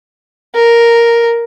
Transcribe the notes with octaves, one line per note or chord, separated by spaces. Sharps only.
A#4